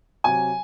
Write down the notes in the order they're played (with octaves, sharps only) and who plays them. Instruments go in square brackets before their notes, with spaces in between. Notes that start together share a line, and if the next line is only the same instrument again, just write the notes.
[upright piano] C3 F#3 G#5